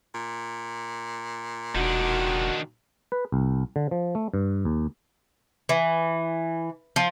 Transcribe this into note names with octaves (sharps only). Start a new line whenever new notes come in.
A#2
E1 D#3 D4 F#4
B4
C2
D3
F3
A3
G2
D#2
E3
F3